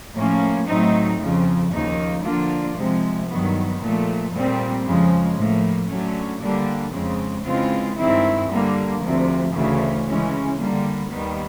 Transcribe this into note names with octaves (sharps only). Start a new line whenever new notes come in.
A2 F3 A#3 C#4
A2 F#3 A3 C4 D#4
F2 C#3 F3
D#2 C#3 F3 A#3 D#4
D3 F3 A#3 D4 F4
C3 F3 G#3
G2 D#3 F#3 B3
A#2 F3 A3
A#2 G3 C4
F2 C#3 F3 G#3
A2 F3 A#3
D3 F#3 A3 C#4
D3 G3 A#3 D4
F2 C#3 F3 G#3 C4
C#3 E3 G#3 C4 F4
G2 D#3 G#3 C4 E4
D3 G3 A#3
D2 C3 F3
D2 C#3 E3
C#3 E3 G#3 C#4
D3 G3 A#3
D#2 D#3 G3 B3